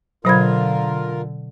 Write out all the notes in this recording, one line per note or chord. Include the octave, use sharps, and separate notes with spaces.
B2 D3 F#3 F4 A#4 C5 B5 G#6